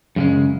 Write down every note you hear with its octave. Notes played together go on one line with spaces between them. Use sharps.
F#2 C#3 G#3